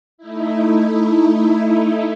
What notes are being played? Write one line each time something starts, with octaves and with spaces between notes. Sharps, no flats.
A3 D#4 E4